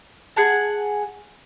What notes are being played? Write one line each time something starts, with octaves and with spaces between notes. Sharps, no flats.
G#4 F#5 A5